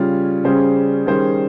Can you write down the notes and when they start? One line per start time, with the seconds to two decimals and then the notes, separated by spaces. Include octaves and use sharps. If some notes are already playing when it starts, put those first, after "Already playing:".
Already playing: C#3 G3 C#4 F4
0.44 C#3 G3 C#4 G#4 C5
1.06 D#3 G3 C#4 G#4 C5